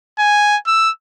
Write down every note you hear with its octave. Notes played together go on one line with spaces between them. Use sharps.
G#5
E6